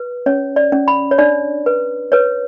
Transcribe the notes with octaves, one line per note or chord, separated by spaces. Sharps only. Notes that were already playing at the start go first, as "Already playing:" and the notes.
Already playing: B4
C#4 C#5
D5
C#4
B5
C#5
D4 D5
B4
B4 C#5